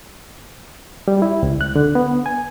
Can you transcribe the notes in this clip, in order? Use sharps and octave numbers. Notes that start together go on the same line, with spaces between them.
G3
E4
C#2
F#6
D3
B3
G#5